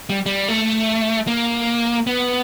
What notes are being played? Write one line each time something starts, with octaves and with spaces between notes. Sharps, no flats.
G3
G3
A3
A#3
B3